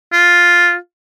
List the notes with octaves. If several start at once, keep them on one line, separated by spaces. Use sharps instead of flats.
F4